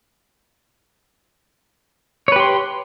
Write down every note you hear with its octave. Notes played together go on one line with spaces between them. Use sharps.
G4 B4 C#5 C6